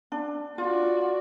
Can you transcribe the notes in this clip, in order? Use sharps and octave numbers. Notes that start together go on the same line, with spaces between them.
D4
F4 F#4 D5